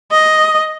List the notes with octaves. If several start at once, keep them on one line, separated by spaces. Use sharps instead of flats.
D#5